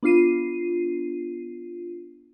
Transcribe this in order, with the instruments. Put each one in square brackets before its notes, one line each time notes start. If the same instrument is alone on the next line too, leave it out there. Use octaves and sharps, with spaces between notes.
[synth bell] B3 D4 F4 C7 D#7